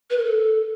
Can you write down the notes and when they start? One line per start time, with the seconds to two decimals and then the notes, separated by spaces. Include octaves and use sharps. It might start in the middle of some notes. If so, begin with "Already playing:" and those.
0.10 B4
0.17 A#4
0.25 A4